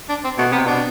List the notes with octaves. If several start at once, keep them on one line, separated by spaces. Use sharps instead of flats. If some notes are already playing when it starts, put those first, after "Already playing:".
D4
C4
B2 A3
C3 B3
B2 D4